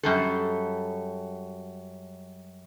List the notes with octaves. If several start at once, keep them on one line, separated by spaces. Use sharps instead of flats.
F#2 G3 A4